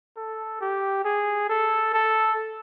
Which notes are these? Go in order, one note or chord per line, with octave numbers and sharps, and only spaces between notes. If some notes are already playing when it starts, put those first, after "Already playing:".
A4
G4
G#4
A4
A4